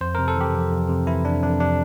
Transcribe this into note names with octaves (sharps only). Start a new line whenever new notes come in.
F2 C5
C3 A#4
A4
E3 G4
F2
F2
C3
E3 E4
F2 D4
F2 D4
C3 D4